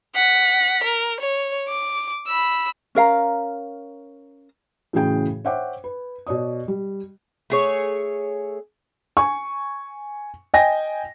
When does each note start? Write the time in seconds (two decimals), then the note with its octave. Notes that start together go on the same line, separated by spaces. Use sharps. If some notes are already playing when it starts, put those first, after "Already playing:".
0.15 F#5 B6
0.83 A#4
1.20 C#5
1.68 D6
2.27 B5 E6
2.95 C#4 A#4 F5 A#5
4.93 A2 C#3 E3 F#4 G#4 G5
5.45 C5 C#5 E5 F#5 G5 D6
5.84 B4
6.27 B2 C#5 D5 D#6
6.68 G3
7.50 A3 G#4 C#5
9.17 G#5 C#6
10.54 D#5 G5 G#5 A#6